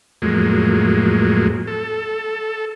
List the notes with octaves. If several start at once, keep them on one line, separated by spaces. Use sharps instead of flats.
F2 A2 F#3 G#3 A#3
A4